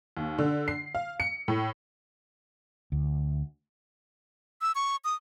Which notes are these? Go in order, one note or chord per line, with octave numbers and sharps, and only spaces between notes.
D#2
D3
C7
F5
C#7
A2
D2
E6
C#6
D#6